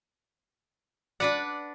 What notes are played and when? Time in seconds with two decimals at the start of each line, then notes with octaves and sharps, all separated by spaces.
1.20 D4 B4 D5 F#5